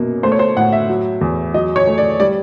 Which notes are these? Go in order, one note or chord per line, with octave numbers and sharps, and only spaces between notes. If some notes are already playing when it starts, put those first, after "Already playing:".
Already playing: F#2 B2 A#3
A3 C5
C#5
C5
A2 F#5
E5
F#3
E2
F#3 D#5
C#5
A3
D5
G3 D5